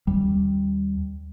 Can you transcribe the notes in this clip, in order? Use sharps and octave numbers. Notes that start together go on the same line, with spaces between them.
D#2 G3